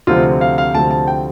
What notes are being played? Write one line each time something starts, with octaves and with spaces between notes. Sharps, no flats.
D2 C3 F3 C4 F4
F5
F5
D2 C3 F3 C4 A5
A5
G5